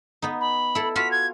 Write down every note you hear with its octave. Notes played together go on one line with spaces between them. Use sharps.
B3 D#4
B5
E4 A4
F4 F#4 F5 B6
G#6